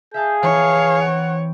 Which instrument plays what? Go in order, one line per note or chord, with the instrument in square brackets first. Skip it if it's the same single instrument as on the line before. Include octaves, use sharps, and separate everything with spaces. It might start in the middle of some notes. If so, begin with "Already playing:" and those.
[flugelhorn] G#4 [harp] E5 F5 A5 [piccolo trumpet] G6
[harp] E3 E4 [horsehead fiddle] C#5 [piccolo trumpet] F5
[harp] C4 D7 [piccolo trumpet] F#5